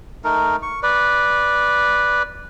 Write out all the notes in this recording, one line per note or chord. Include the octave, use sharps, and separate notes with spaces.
A3 D#4 A#4
C#6
B4 D5